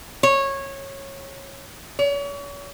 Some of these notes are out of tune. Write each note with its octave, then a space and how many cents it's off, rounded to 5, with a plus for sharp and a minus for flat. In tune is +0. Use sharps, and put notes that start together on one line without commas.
C#5 -15
C#5 +40